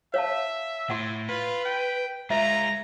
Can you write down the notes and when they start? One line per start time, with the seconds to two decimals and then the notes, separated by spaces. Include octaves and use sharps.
0.14 C#5 E5 F5 A5
0.90 A2 F#5 C6
1.29 F4 B4
1.65 G5
2.30 G#3 F4 E5 A#5